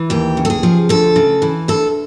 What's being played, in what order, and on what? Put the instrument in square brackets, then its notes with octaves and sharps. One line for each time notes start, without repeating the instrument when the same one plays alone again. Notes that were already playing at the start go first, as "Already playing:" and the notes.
Already playing: [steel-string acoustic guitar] E3
D#2 G4
C#3
A4
G#4
F3
D2 A4
C#3
E3
D2 A4